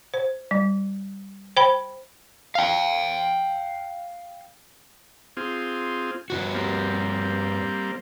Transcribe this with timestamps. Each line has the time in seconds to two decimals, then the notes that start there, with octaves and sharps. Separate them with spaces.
0.14 C5
0.51 G3
1.57 C5 G5 B5
2.55 F5 G5
5.37 C4 F4 G#4
6.30 G2 B2 F#4
6.54 G3 A#3 C4